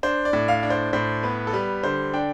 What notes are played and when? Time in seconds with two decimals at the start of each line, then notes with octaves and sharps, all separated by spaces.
0.03 D4 C5
0.25 D5
0.33 A2
0.48 F5
0.63 D4
0.70 C5
0.93 A2 C5
1.23 B3 B4
1.47 A4
1.53 G3 B4
1.83 D3 C5
2.13 D4 G5